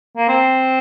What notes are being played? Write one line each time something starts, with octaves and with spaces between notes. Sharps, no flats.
A#3
C4